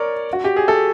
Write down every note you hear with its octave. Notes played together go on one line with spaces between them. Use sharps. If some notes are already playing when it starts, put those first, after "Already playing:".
Already playing: A#4 C#5 D5
F#4
G4
G#4
A4